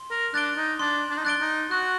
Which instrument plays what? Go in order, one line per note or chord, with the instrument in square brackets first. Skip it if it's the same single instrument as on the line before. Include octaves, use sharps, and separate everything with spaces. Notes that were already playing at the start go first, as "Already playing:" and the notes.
Already playing: [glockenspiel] C6
[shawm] A#4
[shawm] D4 [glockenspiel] F#6 A6 D7 G7
[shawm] D#4
[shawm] D4 [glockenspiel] C6
[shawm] D4
D#4
[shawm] D4 [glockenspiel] F#6 A6 D7 G7
[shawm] D#4
[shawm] F#4 [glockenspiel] F#6